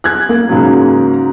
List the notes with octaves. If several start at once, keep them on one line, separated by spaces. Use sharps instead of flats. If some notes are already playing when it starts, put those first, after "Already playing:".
F#6 G#6
A#3
G#2 C#3 F#3